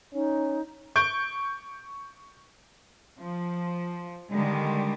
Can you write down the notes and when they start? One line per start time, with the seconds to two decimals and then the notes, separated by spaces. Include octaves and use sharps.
0.14 C#4 D#4
0.96 C#6 G6 D7
3.21 F3
4.31 D3 D#3 G3 G#3